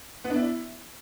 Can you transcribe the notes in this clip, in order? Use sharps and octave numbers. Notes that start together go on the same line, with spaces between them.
B3
D4
E4